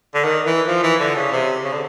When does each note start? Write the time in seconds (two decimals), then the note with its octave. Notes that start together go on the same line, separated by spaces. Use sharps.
0.15 D3
0.24 D#3
0.46 E3
0.67 F3
0.83 E3
1.00 D3
1.16 C#3
1.32 C3
1.64 C#3
1.73 D3